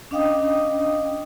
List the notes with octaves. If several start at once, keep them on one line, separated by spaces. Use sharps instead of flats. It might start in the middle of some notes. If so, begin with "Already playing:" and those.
C#4 D4 D#5 F5 G5 D#6